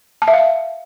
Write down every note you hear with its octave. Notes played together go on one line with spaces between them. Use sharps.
A5
E5
F5